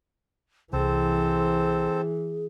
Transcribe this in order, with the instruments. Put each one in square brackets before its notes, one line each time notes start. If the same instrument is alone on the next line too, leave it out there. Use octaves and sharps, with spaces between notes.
[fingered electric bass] C2 [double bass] E3 [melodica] C4 A4 C5 [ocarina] G#4